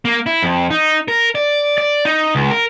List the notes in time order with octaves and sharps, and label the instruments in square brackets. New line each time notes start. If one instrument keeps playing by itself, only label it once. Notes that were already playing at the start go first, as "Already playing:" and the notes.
[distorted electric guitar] A#3
E4
F2
D#4
A#4
D5
D5
D#4
C#2
A#4